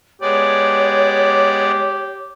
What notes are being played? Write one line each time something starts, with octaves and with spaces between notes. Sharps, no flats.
G#3 B3 G4 C#5 D5